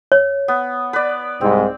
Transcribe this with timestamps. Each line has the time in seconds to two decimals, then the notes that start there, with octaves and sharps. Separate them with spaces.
0.12 C#5
0.48 B3
0.93 B4 D5
1.41 C2 G#2 C4